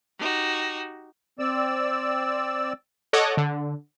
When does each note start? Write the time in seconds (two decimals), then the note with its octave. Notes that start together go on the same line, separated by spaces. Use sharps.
0.18 D#4 F#4 G4
1.39 C4 D5 E6
3.13 A4 C#5 D#5 F#5 D6
3.37 D3